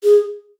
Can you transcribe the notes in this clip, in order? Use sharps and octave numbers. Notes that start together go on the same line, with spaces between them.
G#4